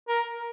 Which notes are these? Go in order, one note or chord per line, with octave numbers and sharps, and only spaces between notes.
A#4